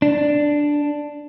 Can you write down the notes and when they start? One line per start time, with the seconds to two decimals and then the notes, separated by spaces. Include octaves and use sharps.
0.02 D4